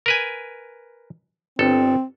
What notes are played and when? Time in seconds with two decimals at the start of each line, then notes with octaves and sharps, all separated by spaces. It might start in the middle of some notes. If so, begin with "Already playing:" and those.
0.06 A#4 B4 G#5
1.59 G1 C4 A4